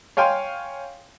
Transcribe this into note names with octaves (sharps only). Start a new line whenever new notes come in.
C#5 F5 G5 G#5 C6